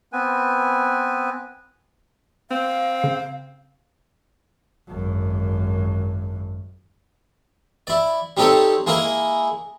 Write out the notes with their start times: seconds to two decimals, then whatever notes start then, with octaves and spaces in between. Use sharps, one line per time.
0.13 B3 C4 B4 G#5
2.51 C4 F5
3.04 C#3
4.88 G#1 F#2
7.87 E4 D5
8.37 G3 C4 D#4 G4 A4 C#5
8.87 G#3 A#3 E4 G#4 A#4